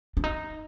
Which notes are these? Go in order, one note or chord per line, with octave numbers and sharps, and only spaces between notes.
D4
D#4